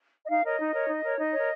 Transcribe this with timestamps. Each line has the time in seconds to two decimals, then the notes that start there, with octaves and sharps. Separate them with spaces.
0.25 D#5
0.29 D#4 F5
0.44 A#4 C#5 D#5
0.59 D#4
0.73 A#4 C#5
0.88 D#4
1.03 A#4 C#5
1.18 D#4 D#5
1.33 C#5
1.38 A#4